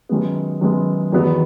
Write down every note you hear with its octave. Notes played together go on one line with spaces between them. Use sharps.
F#2 D#3 G#3 B3
F#2 D#3 G#3 B3
E2 D#3 F#3 B3